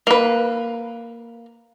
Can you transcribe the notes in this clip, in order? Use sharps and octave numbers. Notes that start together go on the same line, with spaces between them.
A#3 B4